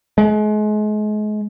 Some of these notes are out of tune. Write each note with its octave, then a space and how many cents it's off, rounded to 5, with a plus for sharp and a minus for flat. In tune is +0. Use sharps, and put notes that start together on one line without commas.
G#3 +35